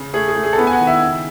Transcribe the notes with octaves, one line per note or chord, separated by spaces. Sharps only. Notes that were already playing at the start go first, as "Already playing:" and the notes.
Already playing: C#3
A3 G#4
G#4
A3
G#4
A4
B3 B4
G#5
F#4 F#5
D#3
E4 E5
C#3